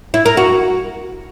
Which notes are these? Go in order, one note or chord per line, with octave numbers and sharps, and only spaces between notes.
E4
A#4
F#4